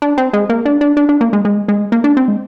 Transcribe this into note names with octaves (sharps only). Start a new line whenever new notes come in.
D4
C4
G#3
A#3
D4
D4
D4
D4
A#3
G#3
G#3
G#3
A#3
D4
C4
G#3